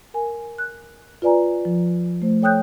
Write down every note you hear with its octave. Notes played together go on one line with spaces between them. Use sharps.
A#4 G#5
F#6
F4 B4 D5 G#5 A#5
F3
A3 C5
A4 C#5 G5 D#6 F#6 G6